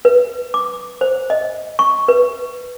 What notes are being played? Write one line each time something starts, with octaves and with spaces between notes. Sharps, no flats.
B4
D6
C5
D#5
C#6
B4